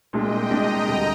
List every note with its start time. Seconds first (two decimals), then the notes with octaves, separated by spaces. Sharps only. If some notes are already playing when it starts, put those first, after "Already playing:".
0.13 C2 A#2 G#3 D4 D#5 G5
0.50 C2 A#2 G#3 D4 G5 A#5
0.88 D2 D3 G3